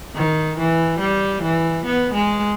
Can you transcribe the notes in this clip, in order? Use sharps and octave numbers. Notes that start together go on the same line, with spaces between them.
D#3
E3
G3
E3
B3
G#3